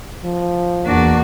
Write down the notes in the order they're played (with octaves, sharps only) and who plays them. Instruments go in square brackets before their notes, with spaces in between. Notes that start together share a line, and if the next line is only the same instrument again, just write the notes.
[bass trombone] F3
[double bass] E2 A#3 [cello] D4 F#4